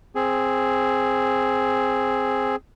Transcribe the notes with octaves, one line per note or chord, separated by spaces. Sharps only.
C4 G#4